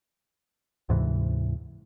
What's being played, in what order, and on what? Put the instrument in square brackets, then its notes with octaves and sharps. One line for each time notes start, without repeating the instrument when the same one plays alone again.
[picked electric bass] D2 G#2 C3 E3